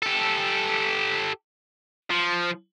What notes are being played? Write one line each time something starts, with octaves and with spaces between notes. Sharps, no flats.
G4 A4
F3